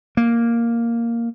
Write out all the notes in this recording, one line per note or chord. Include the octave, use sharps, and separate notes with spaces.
A#3